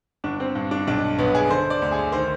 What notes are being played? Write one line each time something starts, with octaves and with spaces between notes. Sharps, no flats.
G1 D4
C4
G2
D4
B1 D4
B1 B3
G#4
D3 C5
D5
D2
G#4
D#3 C5